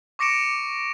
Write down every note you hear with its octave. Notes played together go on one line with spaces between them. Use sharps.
C#6 D6 A#6 C#7 D7 E7